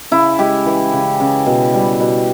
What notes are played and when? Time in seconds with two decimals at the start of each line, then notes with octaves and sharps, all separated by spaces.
0.11 C#3 E4
0.39 G#3 G4
0.66 E3
0.93 C#3
1.20 C#3
1.46 B2
1.74 G3
2.00 B2